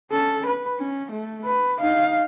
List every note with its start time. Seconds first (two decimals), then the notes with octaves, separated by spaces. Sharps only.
0.11 C#4 A4
0.46 B4
0.79 C#4
1.12 A3
1.44 B4
1.80 D#4 F5